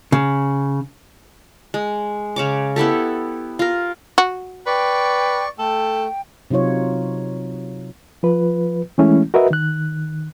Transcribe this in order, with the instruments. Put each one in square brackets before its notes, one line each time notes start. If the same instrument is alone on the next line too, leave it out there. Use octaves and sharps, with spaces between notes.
[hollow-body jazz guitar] C#3
[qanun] G#3
C#3 C#5 D6
B3 E4 G4 A4
F4 A#4
[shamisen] F#4
[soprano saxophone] B4 [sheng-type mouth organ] D5 C#6 [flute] G5
[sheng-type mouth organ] A3 [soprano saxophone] A4 [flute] G5
[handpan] C3 F#3 D#4 F4 C#5
[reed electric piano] F3 F4 B4
E3 G#3 A3 C#4 E4
F#4 A#4 B4 D#5 E5
D#3 F#6